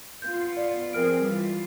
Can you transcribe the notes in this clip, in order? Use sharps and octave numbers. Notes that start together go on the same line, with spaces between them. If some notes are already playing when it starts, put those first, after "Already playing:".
B3 F4 G6
D5
F3 C4 G#4 A#4 F6 D7
E3 G3 F4 B4